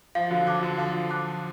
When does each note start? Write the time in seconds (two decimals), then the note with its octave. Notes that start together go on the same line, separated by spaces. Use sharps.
0.15 F3 F5
0.30 D3 F#3
0.47 F3 A5 D6 F#6
0.63 D3
0.77 F3 F5
1.10 A5 D6 F#6